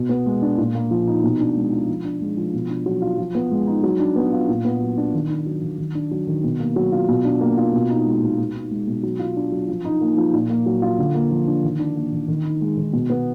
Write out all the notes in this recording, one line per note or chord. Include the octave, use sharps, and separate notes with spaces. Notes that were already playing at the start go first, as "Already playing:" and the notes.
Already playing: B2
B3
G#3
D4
A#2
A#3
F3
D#4
B2
D4
G#3
F4
F3
D4
G#3
F3
B2
D4
F#3
F4
F3
B3
G#3
D#4
F#3
D4
B3
F4
A#2
B3
F#3
D4
D#3
D4
F#3
D#3
D#3
D4
F#3
D#3
B2
A#3
F#3
F4
B2
D4
A#3
F4
B2
D#4
G#3
B2
B2
D#4
G#3
B2
F#3
F4
D4
F#3
F3
D#4
A#3
F3
A#2
A#3
F#3
F4
D3
A#3
F3
D4
D#3
D4
A#3
D#3
D#3
D#4
G#3
D#3
B2
B3